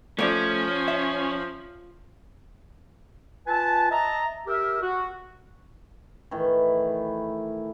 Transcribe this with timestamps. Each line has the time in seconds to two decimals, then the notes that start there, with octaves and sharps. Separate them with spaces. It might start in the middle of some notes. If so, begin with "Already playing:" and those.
0.19 F3 A3 C#4 D5
0.88 E5
3.47 F4 B4 G#5 A5
3.91 D#5 E5 A5 A#5
4.47 G4 A#4 E5
4.82 F#4
6.31 A2 D#3 E3